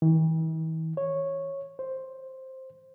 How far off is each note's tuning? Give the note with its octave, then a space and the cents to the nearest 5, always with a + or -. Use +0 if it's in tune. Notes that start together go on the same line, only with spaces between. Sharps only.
E3 -45
C#5 -10
C5 +5